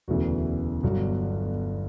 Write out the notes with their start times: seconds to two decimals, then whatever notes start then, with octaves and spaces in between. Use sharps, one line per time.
0.08 E1 D2 C#3 E3 F#4
0.83 G1 G2 F#3 F#4